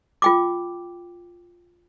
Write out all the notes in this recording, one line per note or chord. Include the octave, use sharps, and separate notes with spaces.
F4 G5 D6